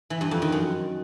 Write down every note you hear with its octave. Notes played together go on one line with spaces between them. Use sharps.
E3
G2
F2
D#3
F#2